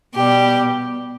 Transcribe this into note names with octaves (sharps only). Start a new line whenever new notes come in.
B2 G3 G4